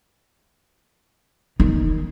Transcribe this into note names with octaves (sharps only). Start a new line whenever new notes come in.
D#3